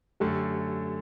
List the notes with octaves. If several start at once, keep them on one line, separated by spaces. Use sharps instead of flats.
F#2 D3 A3 G4